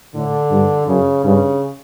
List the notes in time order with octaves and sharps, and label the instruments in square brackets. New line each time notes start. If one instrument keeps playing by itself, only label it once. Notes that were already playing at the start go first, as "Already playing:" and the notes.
[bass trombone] A2 [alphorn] D3
[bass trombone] G2
[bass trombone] F#2 [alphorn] C#3
[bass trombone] G2 [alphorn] C#3